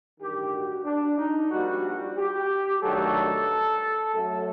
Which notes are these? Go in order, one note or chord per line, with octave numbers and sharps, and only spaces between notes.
A1 G2 D#3 G4
F#4
D4
D#4
A#1 A#2 G3 F#4
G4
G2 D#3 F#3 A3 A4
F#2 F#3 A3 A4